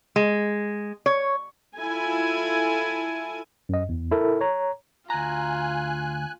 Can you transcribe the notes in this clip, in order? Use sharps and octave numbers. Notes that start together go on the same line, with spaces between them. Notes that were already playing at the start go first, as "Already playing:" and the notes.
G#3
C#5
E4 F4 A4 G#5
F#2 D#5
E2
E4 A4 A#4
C#5 A#5
D2 F4 G#5 A#5 F#6